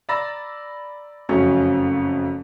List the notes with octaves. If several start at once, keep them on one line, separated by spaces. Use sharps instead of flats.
D5 A#5 B5 E6 A6 A#6
F#1 F2 F#3 A3 C#4